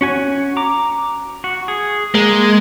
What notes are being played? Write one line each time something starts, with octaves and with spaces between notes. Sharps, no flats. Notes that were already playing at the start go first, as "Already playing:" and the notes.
C#4 F#4 G#5
A#5 D6
F#4
G#4
G#3 A#3